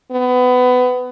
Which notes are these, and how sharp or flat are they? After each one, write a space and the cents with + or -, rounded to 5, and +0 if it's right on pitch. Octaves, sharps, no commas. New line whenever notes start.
B3 +25